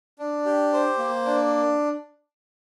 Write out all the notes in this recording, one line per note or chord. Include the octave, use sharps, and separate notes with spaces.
D4
G4
C5
A#3
D4